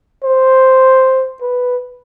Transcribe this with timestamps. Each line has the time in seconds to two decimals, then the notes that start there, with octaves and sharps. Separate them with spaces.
0.24 C5
1.42 B4